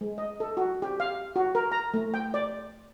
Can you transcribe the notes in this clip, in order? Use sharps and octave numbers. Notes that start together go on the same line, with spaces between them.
G#3
D#5
A4
F#4
G4
F5
F#4
A#4
A#5
A3
G5
D5